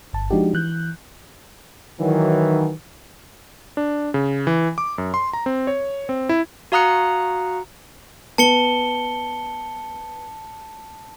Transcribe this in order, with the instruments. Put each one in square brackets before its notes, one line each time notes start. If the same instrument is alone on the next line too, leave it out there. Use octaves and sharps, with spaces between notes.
[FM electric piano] G1 A5
F3 G#3 D4 D#4 F#4 G4
E3 F#6 G6
[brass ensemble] D#3 E3 F#3
[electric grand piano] D4
C#3
E3
D6
F#2
C6
A#5
C4
C#5
C4
E4
[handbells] F#4 F5 A#5 D#6 F#6 C#7
[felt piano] B3 [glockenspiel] A5 C#7 G7